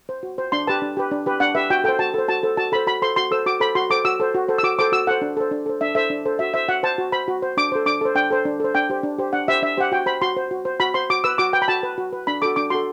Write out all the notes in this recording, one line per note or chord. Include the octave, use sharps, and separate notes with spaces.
C5
F#4
C5
D4 C6
G4 B4 A5
D4
G4 B4
D4
G4 B4
D4 F#5
G4 B4 E5
F#4 G5
A4 C5 G5
F#4 A5
A4 C5
F#4 A5
A4 C5
F#4 A5
A4 C5 B5
F#4 B5
A4 C5 C6
F#4 C6
A4 C5 E6
F#4 D6
A4 C5 B5
F#4 C6
A4 C5 D6
F#4 E6
A4 C5
F#4
A4 C5
E6
F#4 D6
A4 C5 D6
F#4 E6
A4 C5 F#5
D4
A4 C5
D4
A4 C5
D4 E5
A4 C5 E5
D4
A4 C5
F#4 E5
C5 E5
F#4 F#5
C5 A5
F#4
C5 B5
F#4
C5
D4 D6
A4 C5
D4 D6
A4 C5
D4 G5
A4 C5
D4
A4 C5
D4 G5
G4 C5
D4
G4 C5
D4 F#5
G4 C5 E5
D4 E5
G4 C5 F#5
F#4 G5
C5 B5
F#4 C6
C5
F#4
C5
F#4 B5
C5 C6
F#4 D6
B4 E6
F#4 D6
B4 G5
B5
F#4 A5
B4
F#4
B4
D4 B5
F#4 A4 D6
D4 D6
F#4 A4 C6